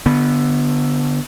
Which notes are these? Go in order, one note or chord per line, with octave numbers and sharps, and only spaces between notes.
D3 B3